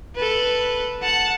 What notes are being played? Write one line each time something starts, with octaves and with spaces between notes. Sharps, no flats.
A4 B4
F#5 A5